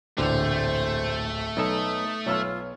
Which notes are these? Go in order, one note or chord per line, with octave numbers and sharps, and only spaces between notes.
D1 A#1 D3 E3 A3 C5 F7
B1 D#4 A4 D#6
B1 F4 C#5 E6 F6